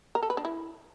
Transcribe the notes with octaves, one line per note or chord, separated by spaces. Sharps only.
A#4
A4
B4
D4
E4